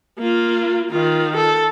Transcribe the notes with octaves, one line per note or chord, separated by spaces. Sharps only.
A#3 F4
D#3 F4
A4